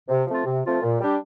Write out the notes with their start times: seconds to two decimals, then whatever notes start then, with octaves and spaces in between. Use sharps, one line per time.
0.09 C3
0.27 F3 A3 C4 F4
0.45 C3
0.63 F3 A3 C4 F4
0.82 A#2
1.00 G3 D4 G4